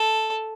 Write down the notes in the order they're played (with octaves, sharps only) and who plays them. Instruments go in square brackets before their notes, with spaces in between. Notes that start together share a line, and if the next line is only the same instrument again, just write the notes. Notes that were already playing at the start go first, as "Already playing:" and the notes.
Already playing: [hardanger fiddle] A4